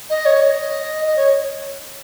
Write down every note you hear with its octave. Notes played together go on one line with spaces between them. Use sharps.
D#5
C#5
D#5
D#5
C#5